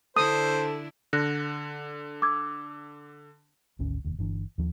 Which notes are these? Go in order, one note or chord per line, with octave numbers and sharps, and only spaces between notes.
D3 D4 E4 A4 C5 D#6
D3 F#6 A#6
D6 E6 G#6
G#1 D2 C#4
F1 D#2
G1 E3 D4
D#2 F3